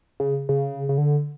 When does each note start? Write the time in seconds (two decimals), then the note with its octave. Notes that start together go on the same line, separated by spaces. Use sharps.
0.20 C#3
0.49 C#3
0.89 C#3
0.98 D3